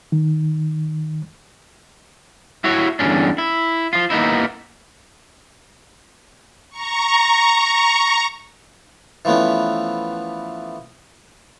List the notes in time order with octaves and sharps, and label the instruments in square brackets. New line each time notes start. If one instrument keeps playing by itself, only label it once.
[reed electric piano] D#3
[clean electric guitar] E4 F#4 C#5
E2 G2 A#2 D3 C#4 D4
E4
F3 F4
A#3 B3 D#4 E4
[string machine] A#5 C#6
[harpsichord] E3 F3 A3 B3 C#4